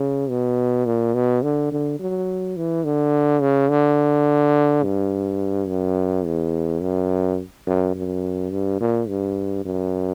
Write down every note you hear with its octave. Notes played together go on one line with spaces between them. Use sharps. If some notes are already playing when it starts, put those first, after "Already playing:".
Already playing: C#3
B2
A#2
B2
D3
D3
F#3
E3
D3
C#3
D3
G2
F#2
E2
F#2
F#2
F#2
G2
A#2
G2
F#2